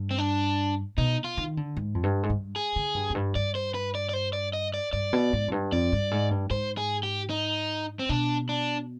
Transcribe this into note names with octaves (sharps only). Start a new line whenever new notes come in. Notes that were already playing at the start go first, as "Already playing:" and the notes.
Already playing: G2
C4
D4
B2 D#4
F4
D#3
D3
G#2
F2
G2
G#2
G2
G#4
D3
G2
F2
G2
G2 D5
C5
B4
D5
D5
C5
D5
D#5
D5
G2 D5
B2
G#2
F2
G2
F2 D5
G2
G#2
G2
G#2 C5
G#4
G4
D#4
C4
B2 D4
D4